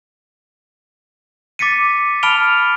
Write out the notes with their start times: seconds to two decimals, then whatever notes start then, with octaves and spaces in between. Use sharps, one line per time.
1.59 D6 A6 B6 C#7 D#7
2.23 A5 B5 F6 D7 F7 G7